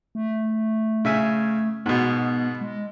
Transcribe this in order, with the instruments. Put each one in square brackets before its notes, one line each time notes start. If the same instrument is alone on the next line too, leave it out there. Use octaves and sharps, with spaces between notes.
[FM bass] A3
[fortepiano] C#3 E5 G#5
[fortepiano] G#2 B2 [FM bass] B3
[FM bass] G#3